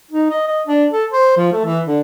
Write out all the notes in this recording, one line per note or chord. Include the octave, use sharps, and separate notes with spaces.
D#4
D#5
D#5
D4
A4
C5
F3
A3
E3
D3